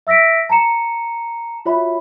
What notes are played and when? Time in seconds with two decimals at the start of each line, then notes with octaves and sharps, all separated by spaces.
0.07 E5 E6 A#6 B6 D7
0.49 A5 A#5 C#7 E7
1.66 F4 F#4 C#5 E5 B5